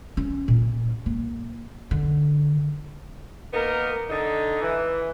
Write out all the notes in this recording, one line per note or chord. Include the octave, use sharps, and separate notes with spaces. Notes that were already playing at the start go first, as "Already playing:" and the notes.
C#4
A#2
A#3
D3
A#3 B3 D#4 A#4
D3 D#4
E3